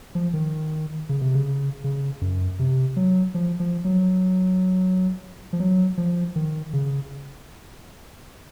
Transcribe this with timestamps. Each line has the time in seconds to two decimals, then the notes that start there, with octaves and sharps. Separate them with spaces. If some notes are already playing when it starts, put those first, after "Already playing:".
0.15 F3
0.33 D#3
1.09 C#3
1.22 C3
1.35 C#3
1.84 C#3
2.21 F#2
2.59 C3
2.96 F#3
3.34 F3
3.60 F3
3.84 F#3
5.53 F3
5.60 F#3
5.98 F3
6.36 D#3
6.73 C#3